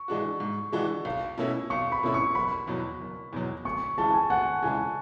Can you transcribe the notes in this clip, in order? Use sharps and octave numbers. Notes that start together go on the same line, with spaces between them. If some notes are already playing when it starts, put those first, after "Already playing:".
Already playing: C#6
E3 G#3 D4 F#4
G#2
E3 G#3 D4 F#4
B1
B2 A3 C#4 E4
B1 C#6
B5
B2 A3 C#4 E4
C#6
F#1 B5
E2 B2 F#3
F#1
E2 B2 F#3
D2 C#6
C#3 E3 G#3 A5
G#5
D2 F#5
C#3 E3 G#3 G#5